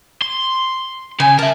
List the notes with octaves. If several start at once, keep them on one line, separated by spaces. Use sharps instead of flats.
C6
C#3 G#5
A#4 E5 A5